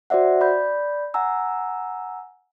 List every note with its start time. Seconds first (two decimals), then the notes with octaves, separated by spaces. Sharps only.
0.10 F#4 C5 D5 E5 F#5
0.41 D5 B5 G6
1.14 F#5 G#5 A#5 E6